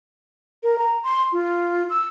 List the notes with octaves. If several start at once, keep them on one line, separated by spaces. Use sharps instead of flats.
A#4
A#5
C6
F4
E6